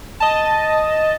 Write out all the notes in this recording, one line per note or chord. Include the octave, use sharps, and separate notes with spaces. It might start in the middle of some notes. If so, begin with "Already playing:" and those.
D#5 A5